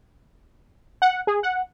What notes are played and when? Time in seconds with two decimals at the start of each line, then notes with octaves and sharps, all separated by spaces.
1.02 F#5
1.27 G#4
1.43 F#5